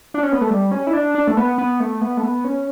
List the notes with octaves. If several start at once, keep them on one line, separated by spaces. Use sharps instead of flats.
D4
C#4
B3
A3
G3
C#4
E4
D4
D4
A3
B3
B3
A3
B3
A3
B3
C#4